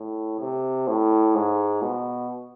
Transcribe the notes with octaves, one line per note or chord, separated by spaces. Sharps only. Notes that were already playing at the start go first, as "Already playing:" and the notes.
Already playing: A2
C3
A2
G#2
B2